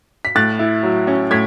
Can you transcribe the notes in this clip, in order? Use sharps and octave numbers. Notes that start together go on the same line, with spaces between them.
B6
A2 F#6 A6
E4
F#3
C#4
A2 G#6 B6